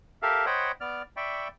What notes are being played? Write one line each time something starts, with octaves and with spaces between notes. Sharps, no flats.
G4 A4 A#4 E5 F5
C5 C#5 D#5 F#5 G5 B5
B3 D5 F6
D5 E5 G5 B5 C#6